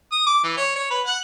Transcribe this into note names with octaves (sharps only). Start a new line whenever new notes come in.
D#6
D6
E3
C#5
C#5
B4
F#5